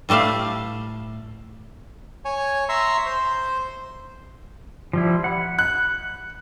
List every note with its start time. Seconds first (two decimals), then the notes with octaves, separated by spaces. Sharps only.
0.09 A2 G3 A3 E5 F5
2.25 C#5 G#5
2.69 E5 A#5 C6 C#6 E6
3.06 C5
4.93 F3 G3 E4
5.24 F#5 B5
5.59 F#6